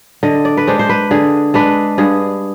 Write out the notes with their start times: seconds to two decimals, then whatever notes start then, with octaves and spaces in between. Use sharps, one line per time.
0.23 D3 D#5
0.45 D5
0.57 B4
0.67 G#3 D4 C5
0.79 C5
0.89 B4
1.11 D3 G#4
1.54 G#3 D4 B4
1.98 G2 G#4